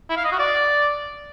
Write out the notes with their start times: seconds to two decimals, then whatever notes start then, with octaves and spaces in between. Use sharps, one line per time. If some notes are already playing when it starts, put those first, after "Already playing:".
0.09 E4
0.17 F5
0.24 D#5
0.32 F#4
0.39 D5